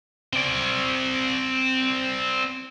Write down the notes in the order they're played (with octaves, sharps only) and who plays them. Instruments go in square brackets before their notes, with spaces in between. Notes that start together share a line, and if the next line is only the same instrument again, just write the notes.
[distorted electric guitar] C4 D5